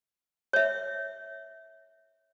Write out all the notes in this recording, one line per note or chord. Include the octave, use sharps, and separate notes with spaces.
C#5 E5